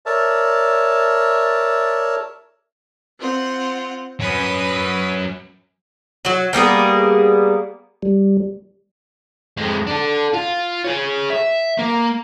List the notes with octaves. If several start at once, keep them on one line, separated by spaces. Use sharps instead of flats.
A#4 C#5 D5 E5 A5
C4 F4 F#5
F#3 C#4 B4 D#6
F#3 F#4
G3 A#3 B3 G#4
G3
F2 G#3
D4 A4
F4
G#4 C#5
E5
A#3